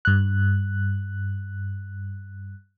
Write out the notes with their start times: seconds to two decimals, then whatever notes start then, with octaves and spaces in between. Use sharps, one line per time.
0.05 G2 F#6